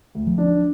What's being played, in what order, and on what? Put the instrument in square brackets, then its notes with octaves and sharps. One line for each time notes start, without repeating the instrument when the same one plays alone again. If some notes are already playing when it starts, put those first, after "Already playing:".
[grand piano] D2
[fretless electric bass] F3
[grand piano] D4